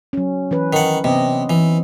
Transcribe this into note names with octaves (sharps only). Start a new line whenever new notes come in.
F#3 C#4
E3 C#4 B4
D#3 F#5
C3 B3 C4 D#5
E3